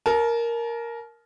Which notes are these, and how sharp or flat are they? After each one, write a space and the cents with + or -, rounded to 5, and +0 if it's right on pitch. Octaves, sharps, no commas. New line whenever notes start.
A#4 +0 A5 -40